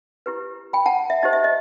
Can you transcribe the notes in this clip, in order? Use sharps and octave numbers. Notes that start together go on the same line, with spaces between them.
E4 G4 B4
G5 B5
F#5 A5
E5
D#4 G4 C5 D#5
E5
D#5